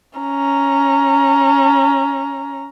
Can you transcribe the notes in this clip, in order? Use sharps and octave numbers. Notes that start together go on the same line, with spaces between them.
C#4 A#5